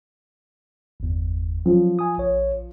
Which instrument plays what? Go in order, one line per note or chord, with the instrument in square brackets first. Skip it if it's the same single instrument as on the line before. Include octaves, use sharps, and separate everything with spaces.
[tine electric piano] G1 E2
[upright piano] F3 [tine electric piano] F#3
[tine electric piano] G#5 D#6
A#1 C#5